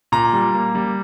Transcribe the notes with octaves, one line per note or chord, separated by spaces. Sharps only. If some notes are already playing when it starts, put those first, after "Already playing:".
A#2 A#5
G3
A#3
G3